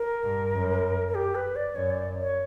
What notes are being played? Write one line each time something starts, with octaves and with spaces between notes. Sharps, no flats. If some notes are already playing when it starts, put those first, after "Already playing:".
Already playing: A#4
G2
F#2
A#4
G4
B4
D5
F#2 C#5
D5
C#5